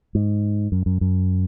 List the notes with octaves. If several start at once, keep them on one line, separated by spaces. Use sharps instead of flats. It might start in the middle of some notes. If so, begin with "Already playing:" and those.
G#2
F#2
F#2
F#2